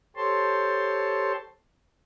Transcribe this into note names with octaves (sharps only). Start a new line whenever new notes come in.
G4 A4 C5 C#5 A5 C6